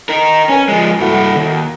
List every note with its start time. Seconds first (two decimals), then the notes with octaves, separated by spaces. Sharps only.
0.09 D#4 A#4
0.49 C#4 A#4 B4 G#5
0.69 F3 G#3
1.00 G2 E4 F#4 A4 F#5
1.36 D#2